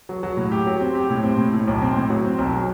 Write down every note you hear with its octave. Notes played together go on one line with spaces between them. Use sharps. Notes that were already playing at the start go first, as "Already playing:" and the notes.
F#3
F#3
A2
G4
F#3
C4
G4
A2
C4
A2
A2
B1
C4
A2
F#3
C4
B1
F#3